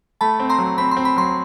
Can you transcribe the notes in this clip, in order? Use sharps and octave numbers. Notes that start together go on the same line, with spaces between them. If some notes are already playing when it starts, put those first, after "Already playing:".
A3 A5 B5
C4
A#5 C6
F#3
C4 B5
C6
C4
B5
F#3 C6